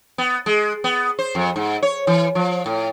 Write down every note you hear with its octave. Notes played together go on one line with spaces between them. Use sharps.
B3
G#3
B3
C5
F2
G#2
C#5
E3
F3
A2